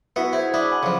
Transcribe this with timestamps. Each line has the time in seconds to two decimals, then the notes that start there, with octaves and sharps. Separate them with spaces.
0.16 B3 E4 F#4 E5 C#7
0.33 E4 G#4 C5 G#6
0.54 D4 E5 B5 D6 D#6
0.71 F#5 G#5 B5
0.83 C#3 F3